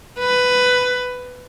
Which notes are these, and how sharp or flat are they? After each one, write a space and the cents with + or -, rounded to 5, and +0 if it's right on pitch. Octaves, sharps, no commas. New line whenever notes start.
B4 +10